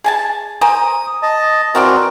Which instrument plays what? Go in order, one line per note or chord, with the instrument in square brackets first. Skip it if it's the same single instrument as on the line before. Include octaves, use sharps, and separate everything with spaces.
[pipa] G#4 G#5 A5
[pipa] A#4 C5 G#5 [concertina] D#6
[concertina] D#5 A5
[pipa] E3 F3 D5 [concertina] C4 F#4 A#4